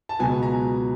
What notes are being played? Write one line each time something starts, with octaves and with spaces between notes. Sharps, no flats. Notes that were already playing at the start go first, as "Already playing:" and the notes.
A5
C#2 B2 F#3 B3 G#5
A#5